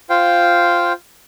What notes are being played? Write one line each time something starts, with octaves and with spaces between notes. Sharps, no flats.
F4 C5 F5 G5